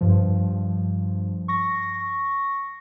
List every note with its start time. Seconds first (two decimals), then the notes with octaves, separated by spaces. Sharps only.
0.01 G2 F3
1.48 C#6 A#6